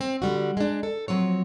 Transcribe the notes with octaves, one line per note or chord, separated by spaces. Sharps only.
C4
D3 G3 F#4
G#3 D4
A4
F3 F#3 C4 C#5